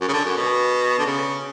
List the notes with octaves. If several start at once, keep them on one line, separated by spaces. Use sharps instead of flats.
F#2
C#3
D3
F#2
B2
D3
C#3